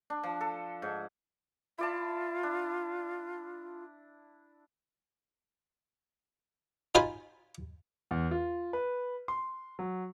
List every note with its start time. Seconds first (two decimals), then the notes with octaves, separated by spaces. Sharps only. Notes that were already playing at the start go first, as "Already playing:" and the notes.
0.10 D4
0.23 F3
0.41 A4
0.82 G#2
1.78 E4 F4 D5 A5
2.43 D4
6.95 D#4 F4 C5 G#5 B5
8.11 E2
8.31 F4
8.73 B4
9.28 C6
9.79 F#3